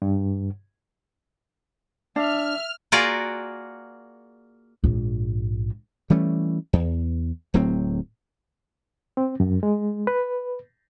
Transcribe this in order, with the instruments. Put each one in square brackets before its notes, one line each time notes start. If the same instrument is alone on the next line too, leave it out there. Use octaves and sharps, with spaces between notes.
[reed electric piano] G2
[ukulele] D4 [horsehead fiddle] E5 [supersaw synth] F6
[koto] A#3 F4 F#4 G#4 A#4 D5
[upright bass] A#1 G#2
[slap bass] E3 G3 A3 C#4
E2
D1 A2 F#3 C4
[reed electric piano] C4
F#2
G#3
B4